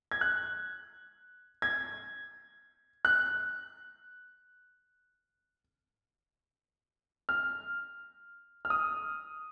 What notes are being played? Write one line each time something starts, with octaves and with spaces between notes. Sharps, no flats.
G#6
F#6
G#6
F#6
F6
F6
D#6